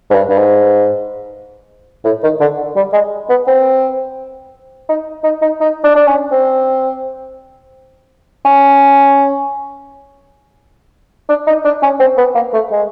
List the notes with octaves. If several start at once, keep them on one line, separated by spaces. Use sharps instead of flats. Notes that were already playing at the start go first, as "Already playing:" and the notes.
G#2
G2
G2
G#2
A2
D#3
D3
G3
G#3
B3
C4
D#4
D#4
D#4
D#4
D4
D4
C#4
C4
C#4
D4
D#4
D4
C#4
C4
B3
A#3
A3
G#3